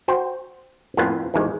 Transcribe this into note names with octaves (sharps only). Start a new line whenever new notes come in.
F#4 C5 G5
F2 A2 A#3 B3 C#4 F4
A1 E2 D#3 F3 G#3